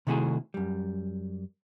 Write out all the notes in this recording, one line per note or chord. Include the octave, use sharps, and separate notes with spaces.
C3 D#3 A3 E4 F#4 G#4
F#2 G3